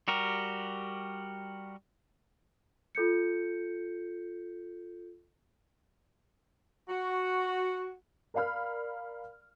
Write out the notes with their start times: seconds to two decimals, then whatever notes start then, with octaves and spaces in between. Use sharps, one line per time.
0.08 G3 F#4 G4 A#4
2.95 F4 A4 G6 C#7
6.89 F#4
8.34 A#4 D5 F5 B5 F6